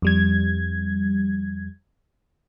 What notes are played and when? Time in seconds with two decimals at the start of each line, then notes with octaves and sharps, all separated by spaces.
0.02 F2 G3 G#6